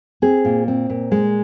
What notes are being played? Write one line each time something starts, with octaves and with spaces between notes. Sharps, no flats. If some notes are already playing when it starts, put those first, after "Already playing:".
C4 G#4
A#2
C4
A#2
G#3